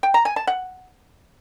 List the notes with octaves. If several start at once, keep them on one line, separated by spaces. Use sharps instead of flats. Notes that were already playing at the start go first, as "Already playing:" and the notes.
G5
A#5
G#5
A5
F#5